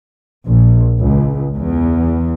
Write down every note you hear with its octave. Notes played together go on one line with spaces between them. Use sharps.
A#1
C#2
E2